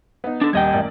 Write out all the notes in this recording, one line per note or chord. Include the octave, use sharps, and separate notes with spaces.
B3 D#4
D4 A4
D#1 G3 G4 D#5 G5 G#6
A1 A#4 D5